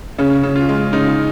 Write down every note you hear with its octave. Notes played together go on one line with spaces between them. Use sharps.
C#3 C#4
C#3
F4
G#3
C#3 D#4